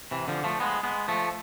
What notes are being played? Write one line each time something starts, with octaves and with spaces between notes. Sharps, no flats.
C3 E3
D3 F3
F3 A3
G#3 B3
G#3 B3
F3 A3